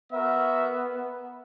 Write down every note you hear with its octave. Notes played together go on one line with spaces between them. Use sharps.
B3 F#4 A#4 E5